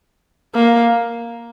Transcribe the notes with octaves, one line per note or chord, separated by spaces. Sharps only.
A#3